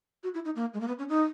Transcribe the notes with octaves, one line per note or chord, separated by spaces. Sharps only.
F#4
E4
D#4
A#3
G#3
A#3
B3
C#4
D#4